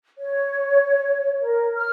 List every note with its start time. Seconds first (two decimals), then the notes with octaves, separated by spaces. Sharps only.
0.19 C#5
1.41 A#4
1.77 F6